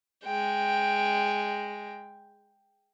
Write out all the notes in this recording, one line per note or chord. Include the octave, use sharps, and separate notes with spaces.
G#3 G5